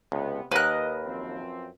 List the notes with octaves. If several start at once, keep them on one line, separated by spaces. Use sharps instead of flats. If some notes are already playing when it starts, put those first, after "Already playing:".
C#2 C3 B3
D#2 A#4 B4 D#5 F#6
F#2 F3 C4